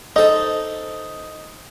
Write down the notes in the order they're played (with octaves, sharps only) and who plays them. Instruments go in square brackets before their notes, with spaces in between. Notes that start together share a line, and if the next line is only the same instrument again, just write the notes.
[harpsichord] D#4 A4 [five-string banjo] C5 D#5